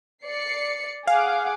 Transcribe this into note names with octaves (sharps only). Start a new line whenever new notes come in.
D5 C7 C#7
G#4 F5 F#5 D6